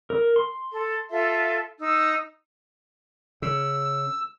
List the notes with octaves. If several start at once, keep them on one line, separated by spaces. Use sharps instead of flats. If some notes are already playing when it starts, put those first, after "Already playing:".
A#4
C6
A4
F4 A4 E5
D#4 E6
C#3 E6